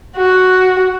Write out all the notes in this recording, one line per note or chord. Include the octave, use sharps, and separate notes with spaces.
F#4